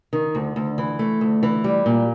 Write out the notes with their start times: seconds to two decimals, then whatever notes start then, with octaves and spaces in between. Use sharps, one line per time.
0.13 D#3
0.35 D2
0.56 D2
0.78 E3
0.99 A3
1.21 D2
1.43 E3
1.64 G3
1.86 A#2